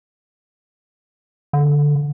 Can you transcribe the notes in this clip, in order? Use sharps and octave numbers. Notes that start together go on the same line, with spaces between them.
D3